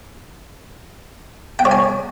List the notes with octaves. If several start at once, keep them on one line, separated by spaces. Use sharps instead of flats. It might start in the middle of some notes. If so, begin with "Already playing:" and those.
G5
C#5
G#5